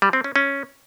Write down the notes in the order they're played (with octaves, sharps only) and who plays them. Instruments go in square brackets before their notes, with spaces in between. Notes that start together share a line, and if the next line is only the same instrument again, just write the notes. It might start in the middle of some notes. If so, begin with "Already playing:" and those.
[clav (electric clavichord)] G3
C4
C#4
C#4